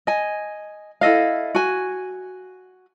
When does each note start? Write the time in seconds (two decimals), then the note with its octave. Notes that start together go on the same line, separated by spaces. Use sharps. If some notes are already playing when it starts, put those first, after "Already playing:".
0.07 D#5 G#5
1.01 E4 A4 D#5 F5
1.55 F#4 G#5